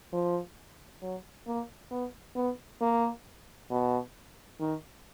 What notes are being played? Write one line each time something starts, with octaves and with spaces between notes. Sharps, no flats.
F3
F#3
A#3
B3
B3
A#3
B2
D#3